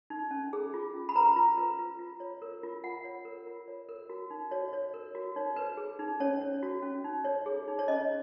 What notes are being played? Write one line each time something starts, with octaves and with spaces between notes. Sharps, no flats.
D#4
C#4
G#4
F4
C#4
B5
B4 A#5
F4
B4
F4
F4
C#5
A#4
F4
F4 F#5
C#5
A#4
F4
C#5
A#4
F#4
D#4
F#4 C#5
C#5
A#4
F#4
D#4 C#5
B4
G#4
D#4
C#4 C#5
C#5
F#4
C#4
D#4
C#5
G#4
D#4
C#5
C#4 D#5